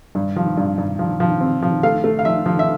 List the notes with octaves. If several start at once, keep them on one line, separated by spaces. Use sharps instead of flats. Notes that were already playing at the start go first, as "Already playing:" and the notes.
G2
F3
G2
G2
F3
F3
C4
F3
A3 F5
A3
F5
F3 E5
F3
E5